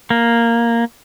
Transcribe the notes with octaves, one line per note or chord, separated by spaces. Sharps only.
A#3